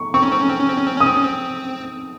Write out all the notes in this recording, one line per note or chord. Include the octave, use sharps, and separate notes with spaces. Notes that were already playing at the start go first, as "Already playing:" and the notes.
Already playing: C#6
C4 C#6
C#4
C4
C#4
C4
C#4
C4
C#4
C4
C#4 D#6
C4
C#4
C4